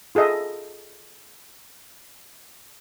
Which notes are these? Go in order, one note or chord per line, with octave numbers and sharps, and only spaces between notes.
F4 G#4 A4 D#5 E5